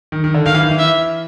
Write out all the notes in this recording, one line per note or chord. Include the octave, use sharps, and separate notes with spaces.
D#3
D#3
D3
D#3 F5
E3
D#3
E3
E5